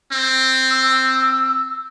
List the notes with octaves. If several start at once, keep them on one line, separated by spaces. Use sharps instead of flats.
C4
E6